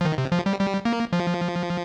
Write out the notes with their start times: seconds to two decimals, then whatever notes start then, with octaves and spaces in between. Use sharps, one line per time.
0.01 F3
0.05 D#3
0.18 C3
0.32 F3
0.46 G3
0.59 G3
0.85 A#3
1.13 F3